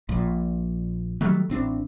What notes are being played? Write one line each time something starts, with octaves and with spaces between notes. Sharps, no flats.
A#1 A#2
D#3 F#3 G3 A3
A1 C4 D4